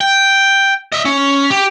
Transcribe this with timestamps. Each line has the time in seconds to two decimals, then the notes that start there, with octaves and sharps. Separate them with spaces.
0.01 G5
0.92 D#5 E5
1.05 C#4
1.50 G4